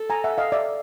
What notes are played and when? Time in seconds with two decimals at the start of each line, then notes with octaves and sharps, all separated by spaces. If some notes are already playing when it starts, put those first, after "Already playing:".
Already playing: A4
0.10 G#5 A#5
0.24 E5 F#5
0.38 D#5 F5
0.52 D5 E5